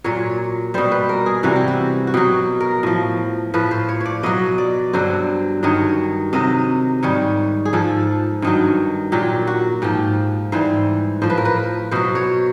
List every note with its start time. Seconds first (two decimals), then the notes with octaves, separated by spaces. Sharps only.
0.04 A#2 F#3 C#5
0.74 B2 G3 C5
0.91 B4
1.09 A#4
1.26 G#4
1.43 C3 E3 G3 F#4
1.56 G4
1.68 F#4
2.07 F#4
2.14 B2 F#3 G4
2.61 A#4
2.83 A2 F3
3.54 A2 F3 B4
3.71 C5
3.89 C#5
4.01 C#5 D5
4.23 B2 F#3 D#5
4.58 D5
4.93 G2 D3 F#3 C5
5.63 G2 D#3 F#3 C#5
6.33 C3 D#3 F#3 D#5
7.03 G#2 D#3 G3 C#5
7.65 G#4
7.73 G#2 F3 A4
8.42 G2 D#3 F#3
9.12 A#2 F#3 G4
9.47 F#4
9.82 G#2 F3 G4
10.52 G#2 E3 G3 C5
11.22 A2 F3 C5
11.30 B4
11.38 A#4
11.45 B4
11.91 B2 F#3 C5
12.15 C#5